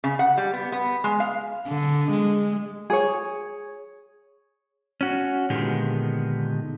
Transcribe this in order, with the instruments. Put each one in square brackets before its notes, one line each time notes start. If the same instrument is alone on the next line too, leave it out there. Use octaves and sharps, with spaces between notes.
[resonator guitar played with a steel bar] C#3
F#5
G3
B3
B3
G#3
F5
[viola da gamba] D3
G#3
[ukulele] G#4 C#5
[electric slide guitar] C#4 F#4
A#2 D3 D#3 G#3 B3 G4